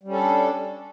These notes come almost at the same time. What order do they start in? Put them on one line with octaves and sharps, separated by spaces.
G3 C#4 A4 D4